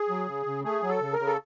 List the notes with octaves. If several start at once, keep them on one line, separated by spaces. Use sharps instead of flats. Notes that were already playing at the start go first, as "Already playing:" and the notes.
Already playing: G#4
F#3
C#3
C#3
A3 G#4
F#3
A4
C#3
A#4
C#3
A4